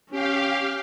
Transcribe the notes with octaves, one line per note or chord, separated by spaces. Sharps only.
C#4 G4 F5